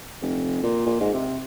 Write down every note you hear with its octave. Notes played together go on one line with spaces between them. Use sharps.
F1
A#2
A#2
G#2
C3